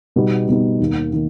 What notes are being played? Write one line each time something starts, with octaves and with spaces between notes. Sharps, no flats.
B2 G3 B3 D#4
B2 G3 B3 D#4
D#2 D#3 A#3
D#3 A#3